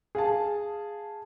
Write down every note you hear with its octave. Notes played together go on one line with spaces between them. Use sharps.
G#4 F5 A5